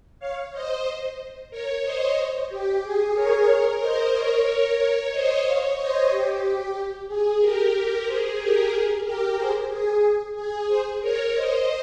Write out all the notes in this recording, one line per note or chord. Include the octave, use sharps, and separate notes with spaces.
C#5 F5
C5 D#5
A#4 C#5
C5 D#5
G4
G#4
A#4 C#5
A#4 C#5
C5 D#5
A#4 C#5
A#4 C#5
C5 D#5
C#5 F5
C5 D#5
G4
G#4
G4 A#4
G#4 C5
G4 A#4
G#4
G4 A#4
G#4 C5
G#4
G#4
G#4 C5
A#4 C#5
C5 D#5